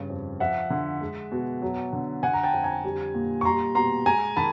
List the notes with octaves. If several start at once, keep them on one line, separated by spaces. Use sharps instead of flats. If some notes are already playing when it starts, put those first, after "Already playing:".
Already playing: G2 C#3
F2
F3 E5 F#5
D3
G#3
B2
F#3
D3
D3 F#5 G#5
A#5
G5 A5
F2
G#5 A#5
G3
A#2
C#6
G3 A#5 C6
B2 A#5 C6
G#3 G#5 A#5
D#3 A5 B5